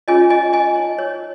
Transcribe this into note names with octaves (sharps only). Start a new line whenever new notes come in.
C#4 F4 G#4 C#5 D#5 G#5
D#5 G#5
D#5 G#5
D#4 C#5 D#5
C#5